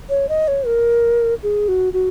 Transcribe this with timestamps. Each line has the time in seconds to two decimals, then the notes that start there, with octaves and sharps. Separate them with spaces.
0.09 C#5
0.29 D#5
0.48 C#5
0.66 A#4
1.43 G#4
1.68 F#4
1.93 F#4